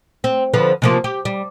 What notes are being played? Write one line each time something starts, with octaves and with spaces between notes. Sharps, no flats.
C4
D3 F3 B4
C3 F3 A#3
G4
G3